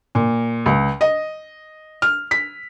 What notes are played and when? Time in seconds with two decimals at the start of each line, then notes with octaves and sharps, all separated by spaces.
0.15 A#2
0.66 C#2
1.01 D#5
2.02 F6
2.31 B6